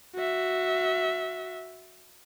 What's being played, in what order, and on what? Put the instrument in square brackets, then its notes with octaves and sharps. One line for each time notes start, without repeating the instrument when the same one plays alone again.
[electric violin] F#4 E5